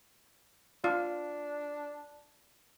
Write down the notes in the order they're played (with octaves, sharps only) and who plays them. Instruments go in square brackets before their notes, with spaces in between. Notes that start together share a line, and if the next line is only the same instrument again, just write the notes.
[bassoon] D4 [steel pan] F4